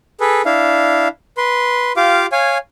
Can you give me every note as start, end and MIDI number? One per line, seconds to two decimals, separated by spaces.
0.20 0.42 68
0.20 0.42 69
0.20 0.42 71
0.45 1.08 62
0.45 1.08 64
0.45 1.08 77
1.37 1.92 71
1.37 1.92 84
1.97 2.26 65
1.97 2.26 67
1.97 2.26 77
1.97 2.26 86
2.32 2.58 73
2.32 2.58 77
2.32 2.58 80